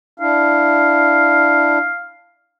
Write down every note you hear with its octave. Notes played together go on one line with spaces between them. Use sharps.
D4 E4 F5